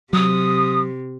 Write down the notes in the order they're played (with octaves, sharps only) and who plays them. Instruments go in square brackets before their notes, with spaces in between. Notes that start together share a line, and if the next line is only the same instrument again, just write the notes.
[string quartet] C3 [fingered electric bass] F#3 [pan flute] D#6